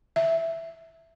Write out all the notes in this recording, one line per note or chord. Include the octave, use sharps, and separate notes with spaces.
E5